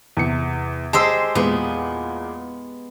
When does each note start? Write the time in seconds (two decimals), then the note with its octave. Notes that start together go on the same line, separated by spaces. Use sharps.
0.17 E2 C3 C#7
0.93 G#3 G4 C5 A5 D#6 E6
1.35 E2 A#2 G#3 B3